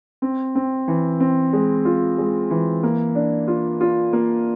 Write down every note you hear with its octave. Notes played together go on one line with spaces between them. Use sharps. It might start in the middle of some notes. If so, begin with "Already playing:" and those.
C4
C4
E3
C4
G#3
F4
G#3
E3
A#3
D4
F4
F4
A#3